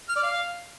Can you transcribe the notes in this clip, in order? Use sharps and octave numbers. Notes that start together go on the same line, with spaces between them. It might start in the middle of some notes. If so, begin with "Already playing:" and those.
F6
D5
F5